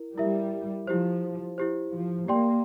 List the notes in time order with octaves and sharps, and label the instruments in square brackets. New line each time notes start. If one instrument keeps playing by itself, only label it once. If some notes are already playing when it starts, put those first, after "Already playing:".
Already playing: [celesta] E4 A#4
[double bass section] G3 [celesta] E4 A#4 E5
[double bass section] F3 [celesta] E4 G4 C5
[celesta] E4 G4 C5
[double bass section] F3
[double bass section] A#3 [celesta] G4 D5 G5 C6